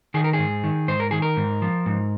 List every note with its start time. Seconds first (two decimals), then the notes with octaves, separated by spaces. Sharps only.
0.14 D#3 G#4
0.24 A#4
0.33 G#4
0.39 G#2
0.64 D#3
0.88 G#2 C5
1.00 A#4
1.11 D#3 G#4
1.22 A#4
1.37 G#2
1.62 F3
1.86 G#2